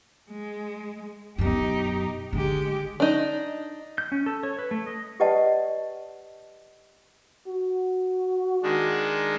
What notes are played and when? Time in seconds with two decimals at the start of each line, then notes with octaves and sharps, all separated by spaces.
0.30 G#3
1.38 F#2 B2 D#4 G4
2.33 D3 G#3 D4 G4
3.00 D4 D#4
3.98 G6
4.12 C#4
4.26 A4
4.43 C#5
4.59 B4
4.71 A3
4.87 D#5
5.20 G4 B4 D5 D#5 F#5 A5
7.47 F#4
8.63 D#3 G#3 D4